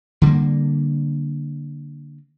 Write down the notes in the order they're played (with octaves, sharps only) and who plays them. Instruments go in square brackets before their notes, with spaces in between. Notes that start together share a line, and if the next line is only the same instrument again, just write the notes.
[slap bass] D3 G3 G#3 A#3